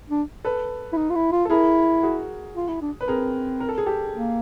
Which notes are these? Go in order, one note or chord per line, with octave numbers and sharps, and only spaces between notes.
D4
A4 B4
E4
D#4
F4
E4
F4
A4
E4 G#4 A#4
F#4 G#4
F4
E4
D4
B4
C4 G#4 A#4
A#4
A4
G#4
G4 A4
A#3